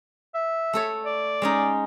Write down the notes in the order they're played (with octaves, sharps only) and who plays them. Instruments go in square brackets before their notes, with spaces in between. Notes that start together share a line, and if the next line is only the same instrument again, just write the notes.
[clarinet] E5
[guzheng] A3 A4 C#5
[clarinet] D5
[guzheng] G#3 C#4 D#4